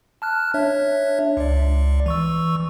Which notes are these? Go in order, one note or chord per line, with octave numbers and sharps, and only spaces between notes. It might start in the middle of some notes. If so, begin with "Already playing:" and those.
A5 F6 F#6
D4 C#5 E5
C#2 D5
E3 C#6 E6